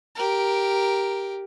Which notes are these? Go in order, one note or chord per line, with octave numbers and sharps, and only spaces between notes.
G4 A#4